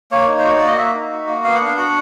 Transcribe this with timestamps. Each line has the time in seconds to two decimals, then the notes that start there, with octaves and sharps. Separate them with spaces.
0.11 A#3 C#5
0.27 D#4
0.39 C5
0.44 F#4 C#5
0.58 A#3 D5
0.67 D#5
0.78 A#3 E5
0.94 D#4
1.11 F#4
1.27 A#3
1.44 B3 F5
1.55 F#5
1.60 D4 F5
1.77 F#4 F#5